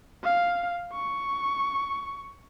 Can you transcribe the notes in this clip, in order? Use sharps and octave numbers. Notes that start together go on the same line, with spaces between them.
F5
C#6